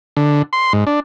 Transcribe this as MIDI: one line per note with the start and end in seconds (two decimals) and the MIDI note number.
0.17 0.42 50
0.53 0.73 84
0.73 0.84 44
0.87 1.00 62